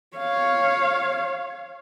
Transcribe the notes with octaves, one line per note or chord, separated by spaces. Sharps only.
C#5 F5